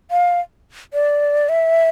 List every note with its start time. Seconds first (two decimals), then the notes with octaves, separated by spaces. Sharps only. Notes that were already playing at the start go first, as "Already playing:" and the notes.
0.11 F5
0.94 D5
1.49 E5